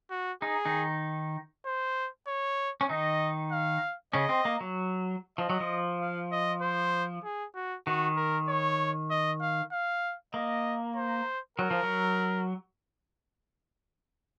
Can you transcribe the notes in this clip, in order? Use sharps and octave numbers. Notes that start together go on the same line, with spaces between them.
F#4
D#4 G#4
D#3 D#4
C5
C#5
C#4
D#3 D#4 D#5
F5
C#3 C#4 D#5
C4
A#3
F#3
F3 D#5
F#3
F3
F5
D#5
C5
G#4
F#4
D#3 F#4
A#4
C#5
D#5
F5
F5
A#3 D#5
C5
F#3 A#4
F3
F#3